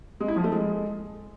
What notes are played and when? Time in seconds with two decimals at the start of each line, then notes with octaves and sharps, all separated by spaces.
0.20 G#3
0.28 E4
0.36 F3
0.44 A3
0.52 G#3